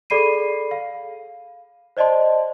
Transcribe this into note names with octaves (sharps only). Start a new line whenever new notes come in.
G#4 A4 D5 B5 C7 D#7
F5
C5 D5 D#5 A5 C6